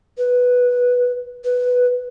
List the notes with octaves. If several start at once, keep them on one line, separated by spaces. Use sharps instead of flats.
B4
B4